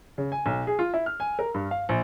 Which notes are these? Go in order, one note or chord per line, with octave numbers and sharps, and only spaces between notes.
C#3
G#5
B1
G#4
F4
E4
F6
G#5
A#4
G2
F5
A#1